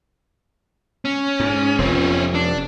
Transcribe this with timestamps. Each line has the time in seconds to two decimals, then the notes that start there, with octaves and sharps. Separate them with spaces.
1.05 C#4
1.40 G#2
1.78 F1 F2 C4 C#4
2.35 D4